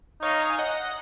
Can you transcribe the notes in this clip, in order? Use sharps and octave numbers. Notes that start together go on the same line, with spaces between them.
D#4 C#5 F5
A#5
G#5
D#5 F#5